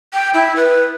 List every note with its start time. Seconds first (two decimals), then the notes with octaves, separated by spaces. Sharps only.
0.14 G5
0.34 E4
0.56 B4